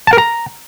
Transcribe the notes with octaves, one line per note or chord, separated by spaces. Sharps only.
A5
A#4
A#5